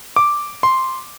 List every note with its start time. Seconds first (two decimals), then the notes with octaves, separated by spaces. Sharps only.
0.16 D6
0.63 C6